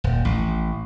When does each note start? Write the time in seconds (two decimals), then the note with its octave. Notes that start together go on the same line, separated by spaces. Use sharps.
0.04 D#1
0.25 A1